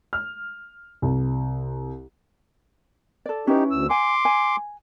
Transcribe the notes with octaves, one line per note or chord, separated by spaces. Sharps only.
F6
C2
A4 D5
C#4 D#4 E4 G4 B4
D2 E6
F#5 G#5 C6 D6
G#5